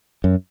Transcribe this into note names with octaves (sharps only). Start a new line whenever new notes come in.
F#2